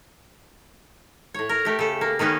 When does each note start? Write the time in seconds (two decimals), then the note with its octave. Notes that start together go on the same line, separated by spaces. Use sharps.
1.34 A2 C#5
1.49 A#4
1.65 A3 G4
1.79 C#3 A4
2.01 A#3
2.19 D#3 A#3 B3 C#4